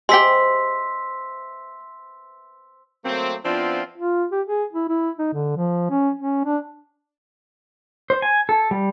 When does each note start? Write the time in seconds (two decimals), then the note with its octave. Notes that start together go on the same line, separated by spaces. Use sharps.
0.09 G#3 G4 B4 C5 E5 C6 E6 B6
3.05 F#3 A3 A#3 C4
3.44 F3 B3 C4 D4 E4 F4
3.97 F4
4.32 G4
4.47 G#4
4.73 E4
4.89 E4
5.19 D#4
5.33 D3
5.56 F3
5.90 C#4
6.20 C#4
6.45 D4
8.10 C5
8.22 G#5
8.49 A4
8.71 G3